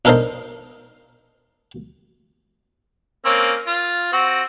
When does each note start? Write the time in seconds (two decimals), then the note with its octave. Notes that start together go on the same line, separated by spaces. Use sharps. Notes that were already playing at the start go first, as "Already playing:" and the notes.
0.05 D4 D#4 A4 A#4 C5 D#5
3.25 A#3 C4 C#4
3.67 F4
4.13 C4 F#4